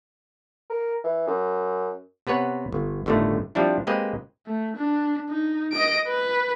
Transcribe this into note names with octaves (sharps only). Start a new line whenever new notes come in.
A#4
E3
F#2
C3 B3 B4 C#5 F#5
G1
G1 A2 D3 D#3 A3
F3 G3 C4 D4 E4
G#3 A#3 C4 G4 B4 D#5
A3
D4
D#4
D#5 D7
B4